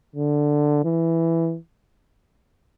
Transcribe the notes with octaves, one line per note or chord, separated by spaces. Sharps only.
D3
E3